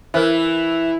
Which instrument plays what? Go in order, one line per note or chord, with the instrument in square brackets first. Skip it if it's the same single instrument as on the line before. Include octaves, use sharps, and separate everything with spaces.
[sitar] E3 [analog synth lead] E4 [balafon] A#4 C5